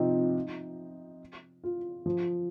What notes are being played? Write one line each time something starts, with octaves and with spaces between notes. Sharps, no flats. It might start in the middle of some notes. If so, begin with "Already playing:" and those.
Already playing: C3 F3 C4 D#4
F4
F3